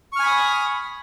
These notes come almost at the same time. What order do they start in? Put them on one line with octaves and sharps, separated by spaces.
C#6 F6 G#5 B5 D#6